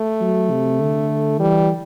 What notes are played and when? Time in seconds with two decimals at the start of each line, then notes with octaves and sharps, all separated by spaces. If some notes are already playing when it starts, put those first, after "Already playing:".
Already playing: A3
0.21 F#3
0.51 C3
0.80 D3
1.39 E3 G3